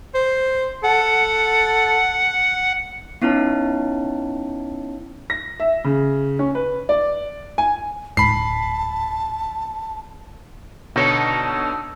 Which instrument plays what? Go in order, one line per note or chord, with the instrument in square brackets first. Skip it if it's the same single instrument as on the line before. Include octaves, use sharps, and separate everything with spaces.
[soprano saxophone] C5
[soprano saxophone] A4 [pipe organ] F#5
[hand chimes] B3 C#4 D#4 E4 C#5 A5
[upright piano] A#6
E5
C#3
C#4
B4
D5
G#5
[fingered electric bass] D1 G#2 [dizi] A5 [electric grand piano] B5 C7
[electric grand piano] B2 D3 C#5 [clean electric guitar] D#4 A4